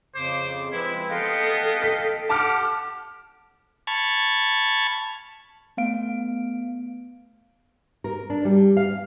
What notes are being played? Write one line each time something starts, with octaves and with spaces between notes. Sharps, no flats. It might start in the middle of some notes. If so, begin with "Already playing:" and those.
F2 C#3 C5 D6
F3 G#3 C4 E4 B4
B3 A4 D#5 F5 G5
B6
G4 F#5 A5 D6 F6
A5 B5 C#6 F6 G#6 A6
A3 B3 F5 D7
A#4
D4
G3
F5